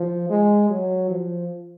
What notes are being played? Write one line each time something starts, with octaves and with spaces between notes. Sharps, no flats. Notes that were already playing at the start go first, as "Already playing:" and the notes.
Already playing: F3
G#3
F#3
F3